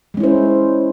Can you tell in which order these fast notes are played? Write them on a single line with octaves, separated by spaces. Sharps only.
G#3 C#4 E4 C5